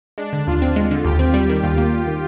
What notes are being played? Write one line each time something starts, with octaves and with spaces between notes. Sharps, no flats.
G#3 D4
D3
D#2 F4
C4
G#3
D3
D#2 G4
C4
G3 G4
D#3
D#2 F4
A#3
G3
D#3